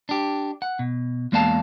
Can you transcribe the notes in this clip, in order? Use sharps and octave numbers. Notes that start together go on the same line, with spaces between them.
D4 G4
F#5
B2
E2 G#3 A#3 D5 F5 A5